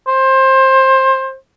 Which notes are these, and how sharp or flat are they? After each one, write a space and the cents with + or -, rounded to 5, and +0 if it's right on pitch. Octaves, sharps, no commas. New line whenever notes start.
C5 +20